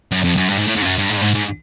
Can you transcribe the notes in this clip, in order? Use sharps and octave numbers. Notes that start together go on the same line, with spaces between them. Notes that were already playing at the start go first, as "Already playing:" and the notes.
F#2
F2
F#2
G2
G#2
A2
G#2
F2
F#2
G2
G#2
G2
G#2
G#2